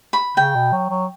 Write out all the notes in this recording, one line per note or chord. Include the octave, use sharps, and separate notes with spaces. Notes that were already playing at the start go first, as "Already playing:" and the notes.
B5
C#3 G5
B2
F#3
F#3